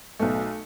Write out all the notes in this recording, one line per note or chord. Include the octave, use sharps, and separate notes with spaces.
B1 B2 A3